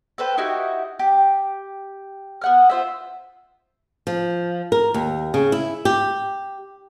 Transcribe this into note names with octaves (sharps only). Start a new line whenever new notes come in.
A4 B4 C5 G5
D#4 E4 F#4 G4
G4
B3 F#5 F6
F4 C5 E5
F3
A#4
D#2
C#3
E4
G4